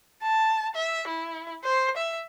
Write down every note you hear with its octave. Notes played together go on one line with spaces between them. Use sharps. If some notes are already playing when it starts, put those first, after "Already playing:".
A5
E5
E4
C5
E5